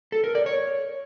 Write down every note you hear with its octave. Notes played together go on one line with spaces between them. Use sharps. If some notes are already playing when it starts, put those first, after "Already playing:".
A4
A#4
D5
C#5